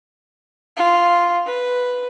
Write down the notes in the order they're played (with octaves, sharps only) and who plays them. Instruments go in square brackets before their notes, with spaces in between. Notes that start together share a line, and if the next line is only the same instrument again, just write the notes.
[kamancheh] F4
B4